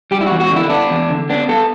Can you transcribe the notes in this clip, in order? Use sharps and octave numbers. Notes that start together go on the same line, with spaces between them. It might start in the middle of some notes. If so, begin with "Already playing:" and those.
G3 G4
E4
E2 F#4
F#4
D3
E4
B3 D4
E2
D3
B3 D4
B3 A4